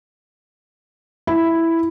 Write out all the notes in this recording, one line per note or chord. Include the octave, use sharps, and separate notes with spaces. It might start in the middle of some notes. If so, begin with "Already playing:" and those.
E4